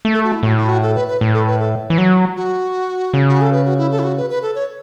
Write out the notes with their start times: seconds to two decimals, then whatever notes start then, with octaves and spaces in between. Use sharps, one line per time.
0.05 A3
0.14 A4
0.24 F#4
0.33 E4
0.43 A2 F#4
0.57 E4
0.69 F#4
0.82 A4
0.95 B4
1.08 B4
1.21 A2
1.34 A4
1.47 B4
1.60 A4
1.90 E3
1.98 F#3
2.37 F#4
3.13 C#3
3.29 F#4
3.41 A4
3.53 B4
3.65 F#4
3.78 E4
3.91 A4
3.99 E4
4.03 F#4
4.17 B4
4.30 B4
4.42 A4
4.55 C#5